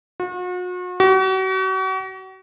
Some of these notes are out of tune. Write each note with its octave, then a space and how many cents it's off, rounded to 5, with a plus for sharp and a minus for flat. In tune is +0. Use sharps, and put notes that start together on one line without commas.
F#4 -40
F#4 +40